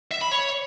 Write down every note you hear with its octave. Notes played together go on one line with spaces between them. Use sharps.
E5
B5
C#5